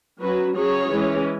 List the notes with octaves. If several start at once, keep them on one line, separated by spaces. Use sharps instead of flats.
F#3 C#4 F#4 B4
F#3 C#4 G#4 C#5
E3 G#3 C#4